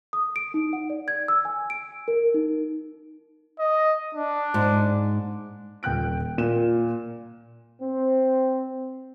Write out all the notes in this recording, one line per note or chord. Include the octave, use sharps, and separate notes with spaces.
D#6
D7
D#4
F#5
D5
G#6
E6
G#5
D7
A#4
D#4
D#5
D4
G#2
D#1 G5 F#6 D7
A#2 E7
C4